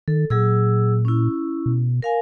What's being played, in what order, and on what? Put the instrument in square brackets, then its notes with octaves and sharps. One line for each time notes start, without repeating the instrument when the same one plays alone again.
[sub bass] D#3 [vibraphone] A4
[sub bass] A#2 [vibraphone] F#3 G#4 E6
[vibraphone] C#4 E4
[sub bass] B2
[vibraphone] A#4 F5 G#5